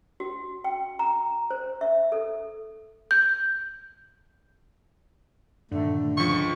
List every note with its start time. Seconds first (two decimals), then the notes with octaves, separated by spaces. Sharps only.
0.20 F#4
0.64 G5
0.99 A#5
1.50 C5
1.81 E5
2.12 A4
3.11 G6
5.71 G2 A#2 D3 D#3 A3
6.17 C#2 F3 C#6